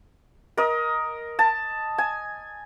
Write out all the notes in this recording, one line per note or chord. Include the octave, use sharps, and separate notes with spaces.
A#4 D#5
A5
G#5